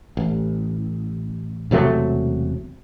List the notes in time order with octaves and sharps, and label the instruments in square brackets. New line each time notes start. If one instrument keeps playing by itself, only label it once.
[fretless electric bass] A1
E1 C3 F#3 A3